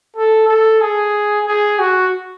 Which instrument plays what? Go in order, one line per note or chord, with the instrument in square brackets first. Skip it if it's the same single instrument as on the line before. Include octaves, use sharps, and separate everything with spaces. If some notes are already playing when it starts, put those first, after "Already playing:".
[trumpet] A4
A4
G#4
G#4
F#4